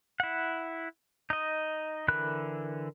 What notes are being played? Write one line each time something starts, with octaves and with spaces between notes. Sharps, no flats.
E4 F#5
D#4 D#5
D3 E3 A#4 B5 F#6